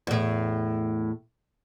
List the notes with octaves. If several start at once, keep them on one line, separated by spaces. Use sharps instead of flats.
E2 A2